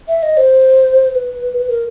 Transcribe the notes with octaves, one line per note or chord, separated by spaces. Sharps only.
E5
D#5
C5
C5
B4
B4
A#4